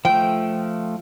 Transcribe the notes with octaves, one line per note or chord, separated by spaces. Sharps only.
F3 A3 G5